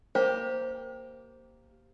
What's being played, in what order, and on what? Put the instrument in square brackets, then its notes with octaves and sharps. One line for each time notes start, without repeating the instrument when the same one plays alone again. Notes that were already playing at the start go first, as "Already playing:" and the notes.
[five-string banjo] A#3 G4 [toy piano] C5